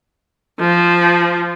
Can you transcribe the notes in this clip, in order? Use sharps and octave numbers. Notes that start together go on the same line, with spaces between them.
F3